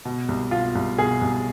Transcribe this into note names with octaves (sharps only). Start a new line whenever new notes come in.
B2
C2
B2 F4
C2
B2 G#4
C2